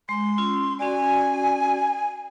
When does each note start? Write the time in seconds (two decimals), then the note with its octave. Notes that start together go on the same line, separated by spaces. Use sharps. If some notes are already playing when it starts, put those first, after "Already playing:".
0.09 G#3 C6
0.38 C#4 F4 E6
0.79 C#4 F#4 D5 G#5